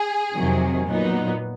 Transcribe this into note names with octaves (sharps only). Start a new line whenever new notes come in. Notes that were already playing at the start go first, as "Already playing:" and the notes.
Already playing: G#4
F2 C3 D#3 F#3
A#2 F#3 B3 D#4